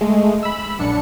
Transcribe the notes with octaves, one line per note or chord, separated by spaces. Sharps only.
G#3 A3
B5 E6
A#1 F#2 D4 C#7